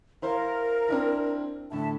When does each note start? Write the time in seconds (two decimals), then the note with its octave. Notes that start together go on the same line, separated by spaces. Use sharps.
0.22 E4 A#4 C5 F5
0.88 C4 D4 E4
1.72 A2 D3 E5 A5